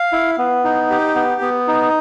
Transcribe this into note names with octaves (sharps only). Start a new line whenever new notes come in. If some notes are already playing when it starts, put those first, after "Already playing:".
Already playing: F5
E4
B3
D#4
G4
B3
B3
D#4